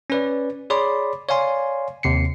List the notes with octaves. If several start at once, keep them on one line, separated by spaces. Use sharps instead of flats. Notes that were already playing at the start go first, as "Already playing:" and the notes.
C#4 B4 D5
G#4 C#5 D5 B5 C6 D6
C#5 D5 F5 G#5 C6
D#2 C3 C7 C#7